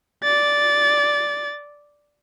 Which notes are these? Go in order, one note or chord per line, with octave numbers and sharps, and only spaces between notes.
D5 A6